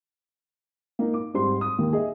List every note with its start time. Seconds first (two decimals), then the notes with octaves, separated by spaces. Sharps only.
0.99 A#3 D#4
1.14 D6
1.34 G#2 G3 C4 C6
1.61 D#6
1.78 D#2 A#3
1.93 G#4 D#5 E5